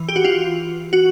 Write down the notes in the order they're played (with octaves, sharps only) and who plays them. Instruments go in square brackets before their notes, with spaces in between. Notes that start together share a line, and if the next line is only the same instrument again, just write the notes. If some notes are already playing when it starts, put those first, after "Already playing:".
Already playing: [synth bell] E3
G4
F#4
F4
F#4